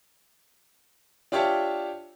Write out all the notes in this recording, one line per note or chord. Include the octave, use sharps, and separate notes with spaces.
D4 F4 G4 C#5 E5 A5